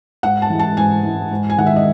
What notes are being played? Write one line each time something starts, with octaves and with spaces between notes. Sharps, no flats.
G#2 F#5
A5
E3 G#3
A5
G#2 G#5
E3 G#3
G#2
G#5
D#3 G#3 F#5
E5
D#5